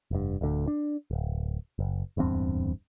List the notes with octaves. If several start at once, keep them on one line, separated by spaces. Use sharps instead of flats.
F1 G2
D1 D2 D3
D4
D1
F#1
D1 E2 G2 C4